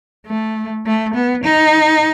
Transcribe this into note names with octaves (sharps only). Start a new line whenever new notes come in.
A3
A3
B3
D#4